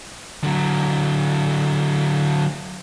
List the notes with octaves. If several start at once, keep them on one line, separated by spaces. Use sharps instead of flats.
D3 F#3